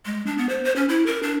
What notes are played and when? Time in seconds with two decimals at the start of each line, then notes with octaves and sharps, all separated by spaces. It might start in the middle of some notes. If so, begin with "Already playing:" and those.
0.06 G#3
0.26 D4
0.38 B3
0.49 C5
0.65 C5
0.76 C#4
0.89 E4
1.06 A#4
1.23 D4